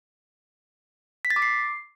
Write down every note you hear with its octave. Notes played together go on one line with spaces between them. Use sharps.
B6
A6
D6
C7